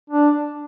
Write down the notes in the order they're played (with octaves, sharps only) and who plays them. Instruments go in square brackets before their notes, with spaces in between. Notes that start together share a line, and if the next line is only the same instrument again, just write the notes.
[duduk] D4